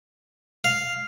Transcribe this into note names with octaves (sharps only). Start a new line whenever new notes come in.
F5